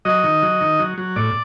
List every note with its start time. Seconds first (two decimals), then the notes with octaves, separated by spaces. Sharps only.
0.05 F#3 D#5
0.24 D#3
0.42 F#3
0.61 D#3
0.79 F#3
0.98 F#3
1.16 A2 D5